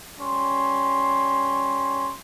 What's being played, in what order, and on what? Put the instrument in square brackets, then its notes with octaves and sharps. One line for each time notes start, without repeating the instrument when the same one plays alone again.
[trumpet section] G3 C#4 C6